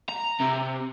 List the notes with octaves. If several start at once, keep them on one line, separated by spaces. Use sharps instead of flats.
A#5
C3